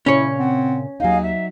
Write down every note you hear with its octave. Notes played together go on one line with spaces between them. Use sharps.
A#2 C#3 C#4 E4 C#5
C4 F#5
D#2 F#3 D#4 G#4 D#5 F5
E5